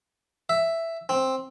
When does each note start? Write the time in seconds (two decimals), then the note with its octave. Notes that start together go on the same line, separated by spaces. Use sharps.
0.49 E5
1.09 C4